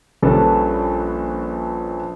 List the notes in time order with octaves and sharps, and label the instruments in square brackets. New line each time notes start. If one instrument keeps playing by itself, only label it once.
[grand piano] A#1 G3 C#4 D4 A4 B4